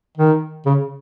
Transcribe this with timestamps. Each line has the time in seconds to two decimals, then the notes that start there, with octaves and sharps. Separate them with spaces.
0.17 D#3
0.65 C#3